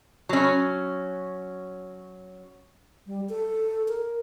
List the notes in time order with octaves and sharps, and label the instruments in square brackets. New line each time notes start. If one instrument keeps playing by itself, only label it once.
[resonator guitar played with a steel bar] F#3 C#4
[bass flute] G3
A4
A#4